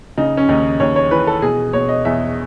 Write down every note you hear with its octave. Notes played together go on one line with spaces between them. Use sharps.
C#3 D#4
C#4
D#2 D#4
D#2 C#5
C#5
E3 B4
A4
B2 G#4
B2 C#5
D#5
E2 E5